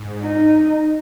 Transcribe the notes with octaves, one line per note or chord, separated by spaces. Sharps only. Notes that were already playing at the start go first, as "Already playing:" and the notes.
Already playing: G#2
D#4